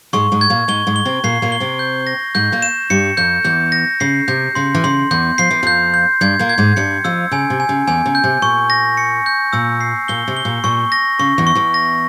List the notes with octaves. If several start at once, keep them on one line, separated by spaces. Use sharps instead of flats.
G#2 G#3 C#6
G#2 G#3
G#6
A#2 A#3
G#2 G#3 G7
G#2 G#3
G7
C3 C4
A#2 A#3 C7
A#2 A#3
G7
C3 C4
G6
A#6
G#2 G#3 G6
A#2 A#3
E7
G2 G3 C#7
F2 F3 G6
E2 E3 G6
A#6
C#3 C7
C3 G6
C#3 C6
E3
C#3 C6
E2 E3 G6
F3 C7
E3
F2 F3 G6
G6
G2 G3 G#6
A#2 A#3
G#6
G#2 G#3
G2 G3 C#7
F2 F3 E6
C#3 G#5
C3
G#5
C#3
E2 E3 G#5
C#3
G6
C3
A#2 C#6
A#6
C#7
G6
A#2 E6
C7
A#2 G7
C3
G7
A#2
A#2 C#6
A#6
C#3 C#6
E2 E3
C#6
E2 E3
A#6